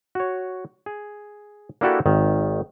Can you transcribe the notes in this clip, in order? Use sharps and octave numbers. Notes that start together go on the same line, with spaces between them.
F#4 C#5
G#4
A#3 D4 E4 F#4 G4 A4
G#1 D#3